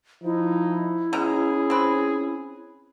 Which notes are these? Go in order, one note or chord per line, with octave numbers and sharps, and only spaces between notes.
F3 D#4 E4
B2 C#4 G#4 A#5
C4 B4